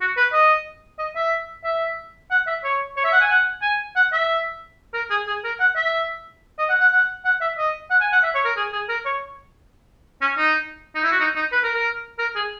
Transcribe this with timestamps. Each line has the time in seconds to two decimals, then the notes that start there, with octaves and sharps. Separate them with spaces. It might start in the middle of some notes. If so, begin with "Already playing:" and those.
0.01 F#4
0.17 B4
0.33 D#5
0.99 D#5
1.15 E5
1.64 E5
2.31 F#5
2.47 E5
2.64 C#5
2.97 C#5
3.04 E5
3.13 F#5
3.21 G#5
3.30 F#5
3.62 G#5
3.96 F#5
4.12 E5
4.93 A#4
5.10 G#4
5.27 G#4
5.44 A#4
5.60 F#5
5.76 E5
6.58 D#5
6.69 F#5
6.80 F#5
6.91 F#5
7.25 F#5
7.41 E5
7.58 D#5
7.90 F#5
8.01 G#5
8.12 F#5
8.23 E5
8.35 C#5
8.45 A#4
8.57 G#4
8.73 G#4
8.89 A#4
9.05 C#5
10.21 C#4
10.38 D#4
10.95 D#4
11.04 E4
11.11 F#4
11.20 D#4
11.36 D#4
11.52 B4
11.63 A#4
11.74 A#4
12.19 A#4
12.35 G#4